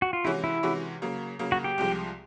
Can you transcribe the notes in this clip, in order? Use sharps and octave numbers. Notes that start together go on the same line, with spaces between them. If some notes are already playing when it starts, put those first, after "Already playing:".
F#4
F4
C3 E3 G#3 C#4 E4 F#4
E4
C3 E3 G#3 C#4 F#4
C#3 F#3 A#3
C#3 F#3 A#3
F#4
G4
C2 C3 F3 G#3